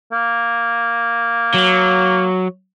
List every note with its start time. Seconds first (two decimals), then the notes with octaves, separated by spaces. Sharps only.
0.12 A#3
1.54 F#3